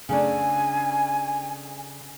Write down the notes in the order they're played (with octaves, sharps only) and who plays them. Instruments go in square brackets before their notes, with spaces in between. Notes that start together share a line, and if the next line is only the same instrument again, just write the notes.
[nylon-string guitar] C#3 A3 D4 [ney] G#5